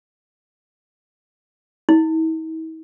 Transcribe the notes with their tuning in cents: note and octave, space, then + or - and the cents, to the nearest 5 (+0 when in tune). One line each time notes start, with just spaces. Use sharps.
E4 -45